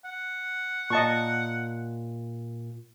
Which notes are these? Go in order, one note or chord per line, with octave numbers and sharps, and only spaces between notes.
F#5
A#2 D#5 A5 C#6